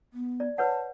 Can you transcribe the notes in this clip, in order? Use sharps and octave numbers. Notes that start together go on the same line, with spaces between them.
B3
D5
B4 C#5 F#5 A5